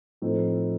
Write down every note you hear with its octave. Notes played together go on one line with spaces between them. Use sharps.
A2 F3 A3 C4 D#4